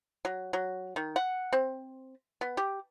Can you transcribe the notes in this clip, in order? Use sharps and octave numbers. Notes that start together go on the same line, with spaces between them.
F#3
F#3
D#3
F#5
C4
B3
G4